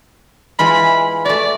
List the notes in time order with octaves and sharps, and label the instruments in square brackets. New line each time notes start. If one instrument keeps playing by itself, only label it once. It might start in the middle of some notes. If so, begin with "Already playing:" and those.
[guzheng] E3 G#3 F4 [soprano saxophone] B5
[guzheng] A3 F#4 [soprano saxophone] D5